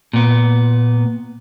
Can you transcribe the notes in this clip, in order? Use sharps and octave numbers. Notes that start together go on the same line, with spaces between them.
A#2 B3